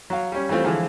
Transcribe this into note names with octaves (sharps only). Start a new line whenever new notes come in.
F#3 F5
G3 C#4
E3 G3 A3 C4 F4
D3 E3 F3 G#3 F4